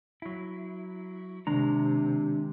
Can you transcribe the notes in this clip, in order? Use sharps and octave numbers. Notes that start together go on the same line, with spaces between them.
F#3 E4
C3 D#3 G#3 D4 A#5